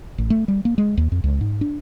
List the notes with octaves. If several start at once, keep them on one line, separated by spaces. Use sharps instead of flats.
A1
A3
G3
A#3
G#3
D#2
F2
C#2
G#2
D4